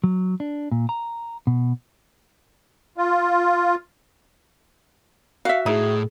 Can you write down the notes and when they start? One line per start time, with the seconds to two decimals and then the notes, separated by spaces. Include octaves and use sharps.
0.04 F#3
0.40 D4
0.72 A#2
0.89 A#5
1.47 B2
2.97 F4
5.45 F#4 E5 F5
5.66 A2 D#4 E4 G#4